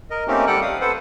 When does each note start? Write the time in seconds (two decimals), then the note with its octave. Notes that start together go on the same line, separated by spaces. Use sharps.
0.10 A#4 D#5
0.28 A3 A#3 C4 C#4 D#4 G4
0.47 G3 G4 A4 F#5 G5 F#6
0.62 F5 D#6
0.81 A4 B4 C5 F#5